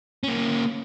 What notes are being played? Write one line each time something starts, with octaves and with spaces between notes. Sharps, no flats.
A#3 C#4